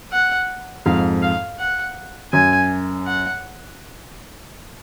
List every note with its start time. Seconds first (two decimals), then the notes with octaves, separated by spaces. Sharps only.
0.13 F#5
0.86 F2 G#2 F5
1.22 F5
1.59 F#5
2.33 F#2 G#5
3.06 F#5